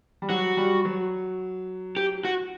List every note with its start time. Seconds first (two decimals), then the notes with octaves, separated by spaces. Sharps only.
0.22 G3
0.29 F#3 F#4
0.57 G3
0.85 F#3
1.97 G4
2.25 F#4